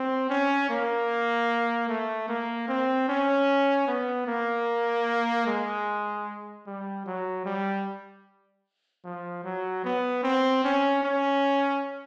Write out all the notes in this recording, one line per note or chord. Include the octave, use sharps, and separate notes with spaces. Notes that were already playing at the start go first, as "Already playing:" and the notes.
Already playing: C4
C#4
A#3
A3
A#3
C4
C#4
B3
A#3
G#3
G3
F#3
G3
F3
F#3
B3
C4
C#4
C#4